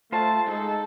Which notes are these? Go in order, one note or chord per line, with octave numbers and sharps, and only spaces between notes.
A3 F4 C5 A5
G#3 D#4 A4